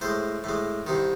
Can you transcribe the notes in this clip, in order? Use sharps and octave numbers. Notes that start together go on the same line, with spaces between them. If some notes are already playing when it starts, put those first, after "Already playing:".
A2 G#3 C5
A2 G#3
C2 C3 D#3